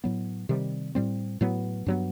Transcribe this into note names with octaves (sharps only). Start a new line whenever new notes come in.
A2 F#3 B3
C3 D#3 G3
A2 G3 C4
A2 F#3 B3
G2 F#3 B3